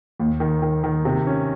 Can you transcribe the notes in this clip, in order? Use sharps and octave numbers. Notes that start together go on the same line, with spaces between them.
D#2
D#3
D#3
D#3
C3
C#4